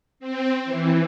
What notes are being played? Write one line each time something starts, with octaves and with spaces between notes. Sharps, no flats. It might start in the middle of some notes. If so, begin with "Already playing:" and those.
C4
E3